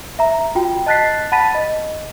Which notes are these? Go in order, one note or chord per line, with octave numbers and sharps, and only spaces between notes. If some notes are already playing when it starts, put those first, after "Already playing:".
E5 A#5
F4 F#4 G5
D#5 A5 F#6 A6 B6 C7
F#5 A5 B5 A6 B6 D#7
D#5